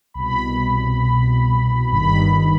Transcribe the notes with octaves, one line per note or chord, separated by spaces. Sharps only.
C2 B2 B5
G1 G2 D#3 B5